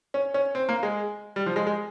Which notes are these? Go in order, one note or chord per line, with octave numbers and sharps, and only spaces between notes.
C#4
C#4
C4
A#3
G#3
G3
F3
G#3
G#3